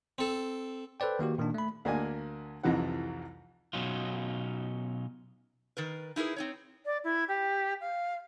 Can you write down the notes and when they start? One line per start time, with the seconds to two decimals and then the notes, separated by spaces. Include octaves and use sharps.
0.18 C4 A4
1.00 A4 B4 C5 D5 G5
1.19 D#3 A#3 F#4 G4
1.38 A#2 D#3 A#3 D4
1.54 A3 B5
1.85 D2 A#3 D4 G#5
2.63 C2 F2 C3 E3 D#4 F#5
3.73 B2 F#3 C#4 D#4 F4
5.77 D#3 A#4 B4
6.16 D#4 E4 G#4 A#4 B4
6.36 C4 D#4 C#5
6.85 D5
7.04 E4
7.28 G4
7.81 F5